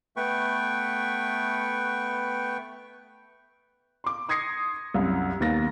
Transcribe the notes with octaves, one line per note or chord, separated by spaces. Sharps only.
A3 B3 B4 G5 C#6
C6 D6
C6 D#6 G#6 A#6 C7 C#7
C2 F#2
D#2 A#3 B3 A6 A#6